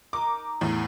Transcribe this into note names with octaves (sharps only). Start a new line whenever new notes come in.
D#4 A#4 D6 F#6
E2 A2